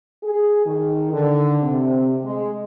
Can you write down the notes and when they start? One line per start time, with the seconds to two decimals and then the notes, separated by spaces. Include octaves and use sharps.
0.23 G#4
0.66 D#3
1.13 D3
1.63 C3
2.24 G#3